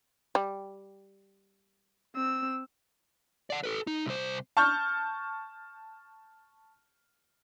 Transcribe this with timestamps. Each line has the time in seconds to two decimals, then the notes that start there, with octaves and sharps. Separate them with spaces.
0.35 G3
2.15 C4 E6
3.50 D5 F#5
3.63 A4 B4
3.87 D#4
4.06 C2 C5
4.57 A5 C#6 F6 G6